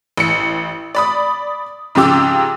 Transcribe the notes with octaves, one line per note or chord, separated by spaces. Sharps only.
A1 C#7
D5 B5 D#6
G#2 C#3 F3 G4 D6 E6